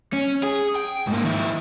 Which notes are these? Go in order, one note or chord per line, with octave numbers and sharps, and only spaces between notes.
C#4
G#4
G5
G#2 A#3
D#3 E4